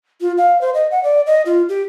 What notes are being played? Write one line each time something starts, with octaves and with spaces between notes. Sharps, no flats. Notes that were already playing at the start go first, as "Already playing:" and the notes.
F4
F5
C5
D#5
F#5
D5
D#5
F4
G4